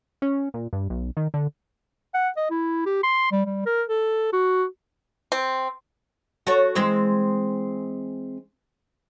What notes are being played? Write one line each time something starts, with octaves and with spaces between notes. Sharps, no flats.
C#4
A#2
G2
B1
D#3
D3
F#5
D#5
E4
G4
C6
G3
G3
A#4
A4
F#4
C4
F#4 A4 C#5
E3 G#3 C4